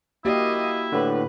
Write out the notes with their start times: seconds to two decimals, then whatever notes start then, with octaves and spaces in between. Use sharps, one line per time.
0.25 A#3 E4 F#4 G4 D#5 F5
0.92 A2 D3 B4